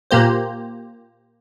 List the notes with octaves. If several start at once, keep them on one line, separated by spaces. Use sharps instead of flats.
A#2 A#3 G4 C5